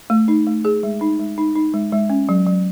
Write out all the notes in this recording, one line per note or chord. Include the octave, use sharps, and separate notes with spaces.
A3
D#4
A3
G#4
G#3
D#4
G#3
D#4
D#4
G#3
G#3
C#4
F#3
F#3